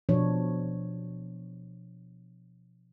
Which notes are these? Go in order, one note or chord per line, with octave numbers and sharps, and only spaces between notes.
B2 F3 D4 C#5